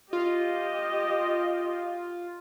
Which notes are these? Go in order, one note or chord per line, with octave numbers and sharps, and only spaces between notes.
F4 G4 D#5